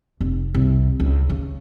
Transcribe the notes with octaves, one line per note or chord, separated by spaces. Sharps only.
F1
C2
C#2
C#3